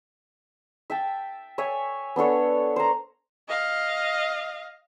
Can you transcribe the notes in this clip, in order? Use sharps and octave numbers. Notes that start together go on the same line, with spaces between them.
E5 G5 A5
C#5 E5 G#5
B3 D4 A4 C#5
C5 A#5
D#5 F5